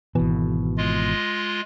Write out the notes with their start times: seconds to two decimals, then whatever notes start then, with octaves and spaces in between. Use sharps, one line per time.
0.15 G#1 B2 E3
0.78 G#3 F4 D#5